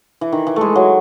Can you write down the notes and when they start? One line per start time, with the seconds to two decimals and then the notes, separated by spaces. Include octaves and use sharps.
0.21 E3
0.32 D#3
0.47 E3
0.56 G#3 A3
0.75 F#3